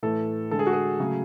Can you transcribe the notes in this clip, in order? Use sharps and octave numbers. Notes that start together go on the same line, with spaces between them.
A2 E3 A3 A4
D3 G#3 A4
G#4
F#4
G#4
C#3 F#3 A3